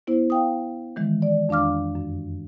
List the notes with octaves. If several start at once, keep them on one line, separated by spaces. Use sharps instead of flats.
B3 E4 C5
F5 G5 D#6
D#3 E3 G#3
D5
F2 D4 F5 D6 F6
F#2